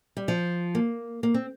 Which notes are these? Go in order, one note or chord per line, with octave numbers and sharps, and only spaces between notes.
G3
F3
A#3
A#3
C4